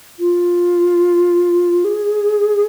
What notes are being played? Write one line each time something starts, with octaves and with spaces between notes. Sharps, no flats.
F4
G#4